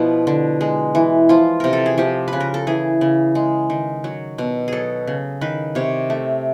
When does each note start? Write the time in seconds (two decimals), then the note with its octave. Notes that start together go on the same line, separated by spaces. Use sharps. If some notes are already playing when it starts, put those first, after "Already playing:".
Already playing: B2 F3 E4
0.27 D3
0.61 G#3
0.95 E3
1.29 F3 F4
1.60 C3 A#4
1.73 A4
1.86 G#4
1.98 F3 G4
2.28 B4
2.33 C#3
2.40 A#4
2.54 A4
2.67 E3 G#4
3.01 C#3
3.35 G#3
3.70 D#3
4.04 F#3
4.38 B2
4.68 F#3 G#4 A4
5.07 C#3
5.41 D#3 B4
5.75 C3 C#5
6.10 A3